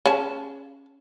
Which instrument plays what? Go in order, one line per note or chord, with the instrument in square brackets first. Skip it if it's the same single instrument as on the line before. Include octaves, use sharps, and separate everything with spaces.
[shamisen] C#4 G#4 A5